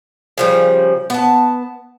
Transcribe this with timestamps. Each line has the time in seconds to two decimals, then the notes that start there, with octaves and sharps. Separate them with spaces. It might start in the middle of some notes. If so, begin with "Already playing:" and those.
0.38 C#3 F3 G3
1.10 B3 A5